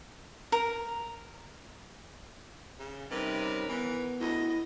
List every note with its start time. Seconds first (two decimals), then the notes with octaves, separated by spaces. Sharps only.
0.52 A#4
2.79 C#3
3.10 C3 G3 C#4 D#4 A#4 B4
3.68 E3 B3
4.20 D2 E4 D#5